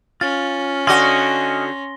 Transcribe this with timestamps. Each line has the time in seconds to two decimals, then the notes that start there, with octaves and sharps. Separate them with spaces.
0.21 C#4 F4 A6
0.87 D3 F#4 D#5 F5 G#5 C6 A#6 G7